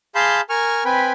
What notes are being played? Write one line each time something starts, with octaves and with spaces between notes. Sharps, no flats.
G#4 F5 A5 B5 C6 G6
A#4 G#5 C#6 F6
C4 B4 G5 G#5 B5